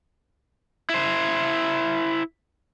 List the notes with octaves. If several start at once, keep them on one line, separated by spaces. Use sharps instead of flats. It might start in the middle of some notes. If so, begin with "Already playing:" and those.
E4 C5